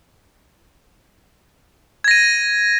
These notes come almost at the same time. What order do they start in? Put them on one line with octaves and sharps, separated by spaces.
G#6 A#6 D#7